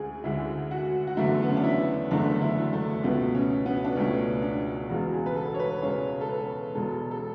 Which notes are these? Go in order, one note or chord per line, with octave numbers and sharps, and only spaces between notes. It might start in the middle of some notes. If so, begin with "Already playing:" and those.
Already playing: D2 D3 G#3 G#4
D2 D3 G#3 E4
F#4
F#4
F#1 E2 D3 A3 E4
B3
C#4
D4
E4
F#1 E2 D3 A3 D4
E4
A3
C#2 B2 A3 B3
C#4
B3
D4
C#2 B2 A3 C#4
D4
E1 E2 C#3 G#3 F#4
G#4
B4
A4
C#5
B4
E1 E2 C#3 G#3 C#5
A4
B4
E1 E2 B2 G#3 A4
A4